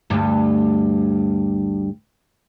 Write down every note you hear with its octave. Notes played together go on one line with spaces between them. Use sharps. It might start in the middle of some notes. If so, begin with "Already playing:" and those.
D2 G2